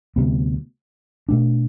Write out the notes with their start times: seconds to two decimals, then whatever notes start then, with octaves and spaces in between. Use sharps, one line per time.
0.16 D2 C3 G3 B3
1.29 B2 A3 D4